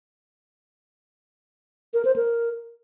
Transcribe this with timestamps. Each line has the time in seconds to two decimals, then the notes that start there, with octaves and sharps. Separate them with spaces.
1.94 A#4
2.05 C5
2.16 A#4